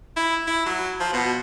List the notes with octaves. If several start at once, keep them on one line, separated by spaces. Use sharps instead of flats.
E4
E4
F#3
F3
B2